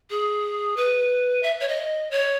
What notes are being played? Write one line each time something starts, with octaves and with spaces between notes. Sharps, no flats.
G#4
B4
E5
C#5
D#5
C#5